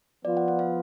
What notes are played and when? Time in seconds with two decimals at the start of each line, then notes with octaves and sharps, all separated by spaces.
0.24 F3 B3 F4 D5
0.37 F#5
0.48 F#5
0.59 F5